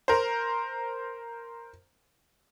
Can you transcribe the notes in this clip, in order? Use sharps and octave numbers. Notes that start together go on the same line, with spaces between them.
A#4 C5